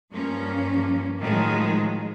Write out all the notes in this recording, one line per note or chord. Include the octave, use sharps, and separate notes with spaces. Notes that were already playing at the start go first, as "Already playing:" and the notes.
G2 F3 A#3 C#4
A2 D#3 F3 F#3 G#3